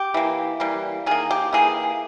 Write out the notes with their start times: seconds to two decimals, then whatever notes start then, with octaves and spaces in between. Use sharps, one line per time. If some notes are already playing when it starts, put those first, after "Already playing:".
Already playing: G4
0.14 E3 A#3
0.60 E3 G3 A#3
1.06 D#3 A#3 G#4
1.31 G4
1.53 E3 A#3 G#4